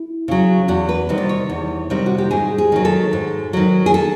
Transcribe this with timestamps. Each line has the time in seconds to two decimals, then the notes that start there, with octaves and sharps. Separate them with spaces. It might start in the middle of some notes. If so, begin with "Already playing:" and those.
Already playing: E4
0.28 C#3 F#3
0.68 E2 F#4
0.89 B4
1.09 C3 D#3 G3
1.18 D5
1.29 C#5
1.50 E2
1.90 C3 D#3 G3
2.06 F#4
2.18 G4
2.31 G#2 G#4
2.58 G#4
2.72 D#3 F#3
2.85 A4
3.13 G#2
3.53 D#3 F#3
3.86 G#4
3.94 A4